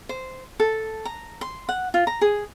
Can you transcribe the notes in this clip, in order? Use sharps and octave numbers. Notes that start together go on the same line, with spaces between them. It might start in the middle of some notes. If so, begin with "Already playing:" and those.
C5
A4
A#5
C6
F#5
F4
A#5
G#4